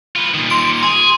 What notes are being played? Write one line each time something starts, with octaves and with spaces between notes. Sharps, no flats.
F4 B4
A#2 D#3
C6 D7
G#4 C6